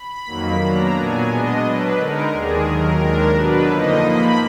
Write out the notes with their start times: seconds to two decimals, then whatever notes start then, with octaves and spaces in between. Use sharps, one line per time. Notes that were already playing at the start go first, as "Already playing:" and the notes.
Already playing: B5
0.26 F2 D#3 F#3 A#3
0.61 B2 F#3 A#3 D4 A#5
0.95 A#2 F#3 B3 D4 G#5
1.29 B2 G#3 B3 D4 D#5
1.62 B2 F#3 D4 B4
1.97 D3 G#3 D#4 A#4
2.31 D#2 D#3 G#3 D4 G#4
2.66 D#2 D#3 F#3 A#4
2.99 D#2 D#3 G#3 D4 A#4
3.34 B2 F#3 D4 B4
3.67 F2 D3 F3 A#3 D#4 D#5
4.01 G#2 F3 A#3 B5